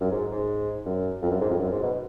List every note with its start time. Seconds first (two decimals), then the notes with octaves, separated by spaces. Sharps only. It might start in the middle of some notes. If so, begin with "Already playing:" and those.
0.01 F#2
0.12 G#2
0.31 G#2
0.86 F#2
1.22 F2
1.31 F#2
1.41 G#2
1.50 F2
1.59 F#2
1.71 G#2
1.83 B2